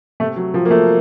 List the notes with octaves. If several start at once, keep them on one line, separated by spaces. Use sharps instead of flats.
C3 A3
F#3
C3 F3
A#3
A3